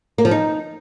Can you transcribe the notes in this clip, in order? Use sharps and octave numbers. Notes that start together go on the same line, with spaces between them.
A#3
F3
D#4